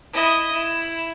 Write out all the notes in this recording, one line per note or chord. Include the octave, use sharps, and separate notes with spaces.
E4 D#5
E4